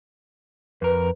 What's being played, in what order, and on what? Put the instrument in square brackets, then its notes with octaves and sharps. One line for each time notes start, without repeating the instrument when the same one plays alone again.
[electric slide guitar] F2 A#4 [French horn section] B4